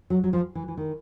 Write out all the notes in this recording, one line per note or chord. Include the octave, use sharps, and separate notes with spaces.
F#3
F#3
F3
E3
E3
D#3